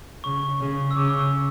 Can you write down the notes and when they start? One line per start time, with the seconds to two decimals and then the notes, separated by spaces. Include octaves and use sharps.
0.24 C#3 C#6
0.61 C#3
0.91 E6
0.96 C#3 D6